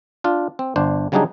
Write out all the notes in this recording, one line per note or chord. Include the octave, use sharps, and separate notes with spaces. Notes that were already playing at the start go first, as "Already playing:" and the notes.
D4 F4
C4
G1 D4 C5
C#3 F#3 G3 D4 D#4 G#4